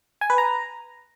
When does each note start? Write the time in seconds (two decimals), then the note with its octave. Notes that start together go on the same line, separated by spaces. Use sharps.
0.21 G#5
0.30 B4
0.38 A#5